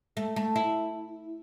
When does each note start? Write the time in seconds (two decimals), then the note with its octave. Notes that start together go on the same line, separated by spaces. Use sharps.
0.17 A3
0.36 A3
0.56 E4